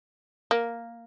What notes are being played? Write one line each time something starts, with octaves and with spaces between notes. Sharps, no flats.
A#3